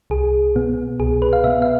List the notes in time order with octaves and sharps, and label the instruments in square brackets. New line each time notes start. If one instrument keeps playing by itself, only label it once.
[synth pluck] C2 G#4
B2 B3
C2 G#4
B4
F5
B2 B3 E5
F5